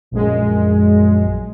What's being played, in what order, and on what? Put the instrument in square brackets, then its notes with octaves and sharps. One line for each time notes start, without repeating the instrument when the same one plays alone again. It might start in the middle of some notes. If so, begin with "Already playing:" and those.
[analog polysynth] A#1 F#2 G#3